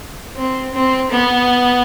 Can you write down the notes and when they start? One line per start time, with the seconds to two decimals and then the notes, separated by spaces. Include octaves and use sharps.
0.37 C4
0.74 C4
1.11 B3